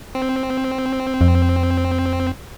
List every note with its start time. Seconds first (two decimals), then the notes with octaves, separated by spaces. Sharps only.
0.15 C4
1.21 F2